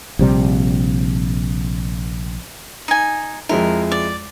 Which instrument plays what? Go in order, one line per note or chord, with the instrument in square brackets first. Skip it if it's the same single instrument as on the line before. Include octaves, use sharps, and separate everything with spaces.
[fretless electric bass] A#1 C3 G3
[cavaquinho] D#4 G#5
[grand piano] F2 G#3 E4 [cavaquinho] A#4
[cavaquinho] D5